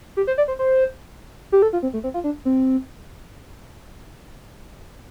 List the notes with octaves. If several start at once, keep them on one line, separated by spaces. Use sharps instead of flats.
G4
C5
D5
C5
C5
G4
A4
F4
C4
A3
C4
F4
D4
C4